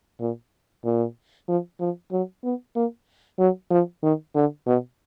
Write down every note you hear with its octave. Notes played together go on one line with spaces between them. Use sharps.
A#2
A#2
F3
F3
F#3
B3
A#3
F#3
F3
D#3
D3
B2